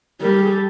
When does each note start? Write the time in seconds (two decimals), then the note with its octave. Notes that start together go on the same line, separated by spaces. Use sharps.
0.21 G3 A#4
0.31 A4
0.42 G#4
0.51 A4